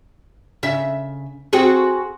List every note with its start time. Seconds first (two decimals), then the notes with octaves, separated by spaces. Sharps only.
0.63 C#3 E5
1.53 C4 F#4 G#4